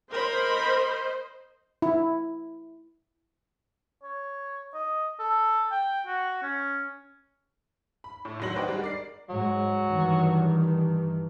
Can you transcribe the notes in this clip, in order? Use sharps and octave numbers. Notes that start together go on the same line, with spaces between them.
A#4 C5 D#5 B5
E4
C#5
D#5
A4
G5
F#4
C#4
B5
A2
F1 D#3 F#3 A#6 F#7
F#4 B4 C5 D5 D#5 G5
G3 G#3 D#4 F#4
A#4 D5 C7
G#2 F#3 G#3
G2 D#3 E3